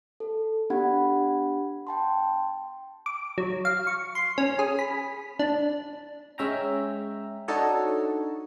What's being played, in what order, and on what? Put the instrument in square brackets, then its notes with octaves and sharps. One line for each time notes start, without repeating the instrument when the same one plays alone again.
[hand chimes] A4
B3 D4 G4 F#5 B5 G#6
G5 A5 C6
[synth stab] D6
F#3
F5
C#6
C6
C#4
G#4
B5
D4
[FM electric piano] G#3 C#4 E5 G5 A#5
D4 D#4 F#4 A4 C#5 D#5